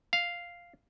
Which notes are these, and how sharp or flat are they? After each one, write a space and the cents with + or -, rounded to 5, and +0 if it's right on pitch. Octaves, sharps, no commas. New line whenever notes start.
F5 -5